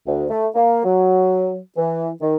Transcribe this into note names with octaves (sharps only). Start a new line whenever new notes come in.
D2
A3
A#3
F#3
E3
D#3